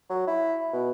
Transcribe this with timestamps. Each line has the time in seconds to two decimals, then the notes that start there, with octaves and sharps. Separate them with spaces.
0.10 F#3
0.27 E4
0.73 B2